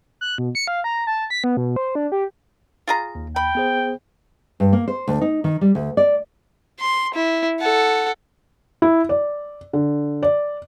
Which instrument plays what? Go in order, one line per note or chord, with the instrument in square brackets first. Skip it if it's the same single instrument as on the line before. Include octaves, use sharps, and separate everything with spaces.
[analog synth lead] F#6
B2
C#7
F5
A#5
A5
B6
B3
B2
C5
D4
G4
[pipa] F4 G#4 A#5
[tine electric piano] D#2
[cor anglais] G5 [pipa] B5
[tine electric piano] B3 G#4 C5
[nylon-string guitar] G2
A#3
C5
D2
D#4
D#3
G3
D2
D5
[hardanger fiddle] C6
E4
A4 F#5
[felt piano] E4
D5
D3
D5